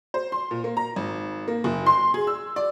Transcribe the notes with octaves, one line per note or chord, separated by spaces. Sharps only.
C5
C6
A#2
A#3
A#5
G#1
A#3
F#1
C6
G#4
E6
D5